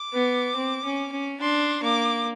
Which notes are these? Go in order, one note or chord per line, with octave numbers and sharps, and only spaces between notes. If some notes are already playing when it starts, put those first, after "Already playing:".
Already playing: D6
B3
C4
C#4
C#4
D4 C6
A#3 D6